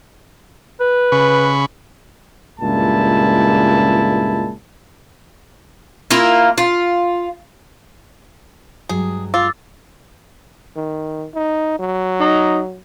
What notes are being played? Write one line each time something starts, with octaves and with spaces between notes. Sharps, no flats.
B4
C#3 B5 C#6
C#2 G2 A#2 G#3 E4 A5
A#3 E4 F4 A#4
F4
G2 F#3 G#3 G#4
F4 D6 E6 A6
D#3
D#4
F#3
D#4